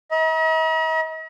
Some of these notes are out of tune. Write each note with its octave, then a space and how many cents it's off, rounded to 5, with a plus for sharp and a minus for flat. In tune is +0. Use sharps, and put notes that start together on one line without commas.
D#5 +45 A#5 +45